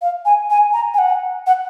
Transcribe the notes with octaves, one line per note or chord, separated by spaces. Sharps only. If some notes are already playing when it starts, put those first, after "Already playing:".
F5
G#5
G#5
A#5
G#5
F#5
F#5